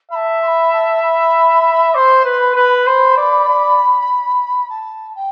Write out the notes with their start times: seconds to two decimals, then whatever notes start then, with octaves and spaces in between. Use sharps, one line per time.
0.11 E5 A5 B5
0.42 C6
0.47 B5
0.73 A5
1.03 B5
1.94 C5 C6 D6
2.25 B4
2.31 C6
2.40 B5
2.56 B4
2.86 C5
3.17 D5
3.48 D5
4.70 A5
5.15 G5